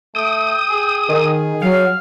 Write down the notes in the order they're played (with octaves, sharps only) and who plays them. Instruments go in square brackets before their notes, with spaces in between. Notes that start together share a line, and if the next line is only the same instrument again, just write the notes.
[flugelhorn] A3 [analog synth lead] G5 [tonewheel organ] D#6
[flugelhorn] G#4
[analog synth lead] D#3 [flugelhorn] G#4
[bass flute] F#3 [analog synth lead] F5